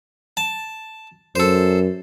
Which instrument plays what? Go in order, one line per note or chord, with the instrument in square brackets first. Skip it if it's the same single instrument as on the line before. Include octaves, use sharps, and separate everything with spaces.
[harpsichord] A5
[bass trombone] F#2 [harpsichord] A4 C5